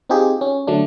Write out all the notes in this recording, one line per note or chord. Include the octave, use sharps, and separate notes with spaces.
C4 D#4 F4 G4 G#4
C#4
D3 F#3 A3 D4